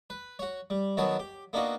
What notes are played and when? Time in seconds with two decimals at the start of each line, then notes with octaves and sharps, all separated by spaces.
0.10 B4
0.39 F#4 C#5
0.70 G3
0.97 D#3 F#3 B3 C#5 A5
1.19 G4
1.53 A#3 B3 D4 D#4 F4 F#4